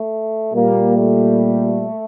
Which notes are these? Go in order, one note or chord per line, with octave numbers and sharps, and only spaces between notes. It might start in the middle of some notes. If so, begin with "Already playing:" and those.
Already playing: A3
A#2 G3 A#3
A3